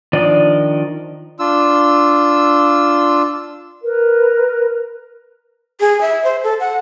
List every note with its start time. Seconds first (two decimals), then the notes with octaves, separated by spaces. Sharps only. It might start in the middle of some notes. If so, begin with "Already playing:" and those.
0.13 D#3 F3 D4 D5 D#5
1.39 D4 F4 E6
3.83 A#4 B4
5.80 G#4
6.01 E5
6.24 C5
6.44 A4
6.60 F#5